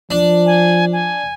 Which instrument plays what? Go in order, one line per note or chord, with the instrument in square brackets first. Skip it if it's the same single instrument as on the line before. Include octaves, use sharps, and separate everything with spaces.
[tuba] F3 [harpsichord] D4
[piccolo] G#5
G#5